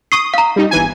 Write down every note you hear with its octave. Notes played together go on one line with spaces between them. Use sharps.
C#6 D#6 C7
F5 A#5
G3 D#4
G1 E3 G#5